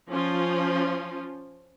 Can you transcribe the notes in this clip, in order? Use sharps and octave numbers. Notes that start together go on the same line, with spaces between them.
F3 C#4 F4